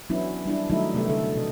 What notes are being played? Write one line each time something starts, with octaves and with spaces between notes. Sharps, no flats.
E3 F#3 B3 C#4 D4 E4
G3 D4 E4
D#3 F#3 G3 A3 D#4 E4
C3 A3 B3 G4 E5
D3 A4
B2 D#5